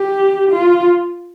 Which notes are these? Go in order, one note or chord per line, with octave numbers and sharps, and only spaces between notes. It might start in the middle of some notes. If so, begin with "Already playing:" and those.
Already playing: G4
F4